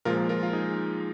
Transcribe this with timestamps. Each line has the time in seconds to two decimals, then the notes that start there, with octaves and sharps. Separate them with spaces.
0.05 A#2 F3 G#3 F4 A#4
0.29 F4 A#4
0.43 F4
0.53 D#4 G#4